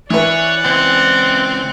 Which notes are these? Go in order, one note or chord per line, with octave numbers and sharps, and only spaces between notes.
E3 B4 C#5 D5 F#5
C#2 C4